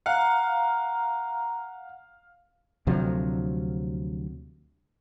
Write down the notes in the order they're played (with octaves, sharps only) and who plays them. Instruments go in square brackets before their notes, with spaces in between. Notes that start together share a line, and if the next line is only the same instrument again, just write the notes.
[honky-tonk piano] F5 [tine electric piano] F#5 [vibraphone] A#5
[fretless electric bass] D2 C3 F3 F#3